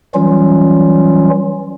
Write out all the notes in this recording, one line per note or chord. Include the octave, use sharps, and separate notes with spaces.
E3 F#3 G3 C#4 F4